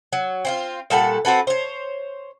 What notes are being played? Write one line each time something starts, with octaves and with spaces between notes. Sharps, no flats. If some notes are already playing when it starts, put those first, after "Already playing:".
F#3
C4 E4 F4
A#2 G3 A4 F#5
C4 F#4 A4 B4
C5 C#5